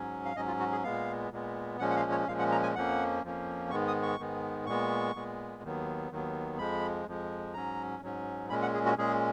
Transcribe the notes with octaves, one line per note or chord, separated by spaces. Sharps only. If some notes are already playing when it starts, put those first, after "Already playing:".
Already playing: G#2 F#3 C#4
F5
G#2 F#3 C#4 D#5
F4
F#4
G#4
A#2 G#3 B3 F5
A#2 G#3 B3
A#2 F3 G#3 C#4 F#5
F#5
F5
C#5
A#2 F3 G#3 C#4 F5
F#5
A#5
G#5
F2 F3 A#3 C#4 F#5
F2 F3 A#3 C#4
G#2 D#3 G#3 B3 C#6
D#6
C#6
G#2 D#3 G#3 B3
A#2 G#3 B3 C#6
A#2 G#3 B3
D#2 D#3 F#3 B3
D#2 D#3 F#3 B3
F2 F3 G#3 B5
F2 F3 G#3
G#2 F#3 C#4 A#5
G#2 F#3 C#4
A#2 G#3 C#4 B5
F#5
G#4
F#4
A#2 G#3 C#4 G#4